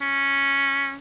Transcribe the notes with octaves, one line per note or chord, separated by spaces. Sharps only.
C#4